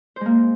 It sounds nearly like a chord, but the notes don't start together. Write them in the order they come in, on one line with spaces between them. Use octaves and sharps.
C5 G#3 A#3